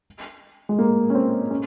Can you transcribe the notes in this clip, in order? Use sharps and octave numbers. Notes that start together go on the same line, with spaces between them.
G#3
A#3
C#4
C4
C#4